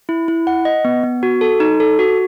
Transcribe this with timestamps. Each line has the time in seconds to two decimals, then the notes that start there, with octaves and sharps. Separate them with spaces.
0.09 E4
0.28 E4
0.47 F#5
0.65 D#5
0.85 B3
1.03 B3
1.23 F#4
1.41 A4
1.60 D#4
1.80 A4
1.99 F#4